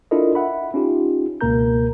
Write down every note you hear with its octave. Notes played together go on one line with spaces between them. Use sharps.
D4 E4 F4 A4 A#4 D#5
E5 F#5 B5
C#4 D#4 F4 G4
C#2 B2 A#3 A#4 A#5 G6